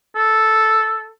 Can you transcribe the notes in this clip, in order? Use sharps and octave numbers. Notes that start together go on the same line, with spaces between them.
A4